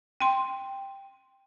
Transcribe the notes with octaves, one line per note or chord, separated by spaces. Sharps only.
G5 C6